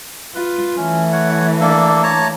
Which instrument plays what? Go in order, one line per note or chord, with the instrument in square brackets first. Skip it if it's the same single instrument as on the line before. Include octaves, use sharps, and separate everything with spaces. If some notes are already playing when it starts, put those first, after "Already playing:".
[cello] F4 [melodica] B4
[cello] E3 A3 [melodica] C#4
[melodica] C#5 F#5
A#3 D4 A4
C#5 A5 A#5